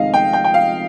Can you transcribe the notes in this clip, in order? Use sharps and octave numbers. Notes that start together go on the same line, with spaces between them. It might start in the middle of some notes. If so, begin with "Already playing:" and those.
Already playing: F1 F2 D#3 G#3 D#5 F5
G5
G5
G5
F5